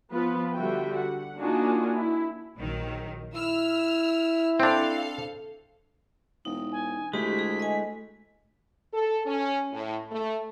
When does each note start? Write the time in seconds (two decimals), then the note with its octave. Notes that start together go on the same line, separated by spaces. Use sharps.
0.12 F3 B3 F4 B4
0.53 D3 G3 F#4 E5 G5
0.95 F#5
1.39 A#3 D4 D#4 F4 F#4 G#5
1.94 E4
2.57 A#1 D#3 F#3
3.35 E4 E6 F6
4.60 C4 D4 A4 F5
6.45 E1 D#4
6.72 G#5
7.13 D2 G#3 A3 E4 G4 B6
7.39 G#4
7.60 D#5 G#5
8.93 A4
9.26 C#4
9.72 A2
10.11 A3